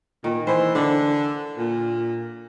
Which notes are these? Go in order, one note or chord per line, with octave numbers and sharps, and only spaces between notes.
A#2 D#3
E3 C5
D3 D4
A#2